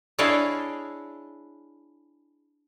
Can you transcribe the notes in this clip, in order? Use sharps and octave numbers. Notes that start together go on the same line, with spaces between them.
D4 E4 G#4 C#5 D#5 F5